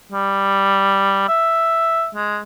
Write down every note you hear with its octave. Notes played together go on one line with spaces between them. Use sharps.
G3
E5
G#3